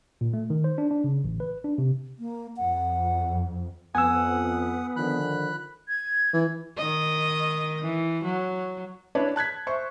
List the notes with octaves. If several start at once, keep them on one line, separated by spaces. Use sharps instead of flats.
A#2
A3
D#3
C5
D4
D4
C#3
A1
B4
D4
C3
A#3
F2 F#5
F2 B3 F#5 G#5 D#6 E6
D3 D#3 F3 B5 F#6
G#6
E3
D#3 D#5
E3
F#3
D4 E4 B4 C#5
A5 F#6 G#6 B6
C5 E5 C#6